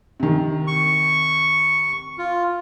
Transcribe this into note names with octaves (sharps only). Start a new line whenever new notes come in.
C3 D#3
C#6
F4